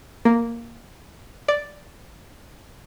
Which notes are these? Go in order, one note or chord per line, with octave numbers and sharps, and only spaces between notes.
A#3
D5